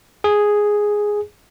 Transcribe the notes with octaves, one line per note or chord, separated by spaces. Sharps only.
G#4